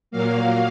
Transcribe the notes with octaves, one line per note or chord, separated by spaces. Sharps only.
A#2 F#3 A#3 F5